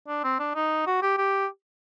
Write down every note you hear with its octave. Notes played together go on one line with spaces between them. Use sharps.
D4
C4
D4
D#4
F#4
G4
G4